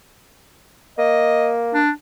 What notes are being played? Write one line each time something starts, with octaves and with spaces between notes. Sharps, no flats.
A#3 D#5
D4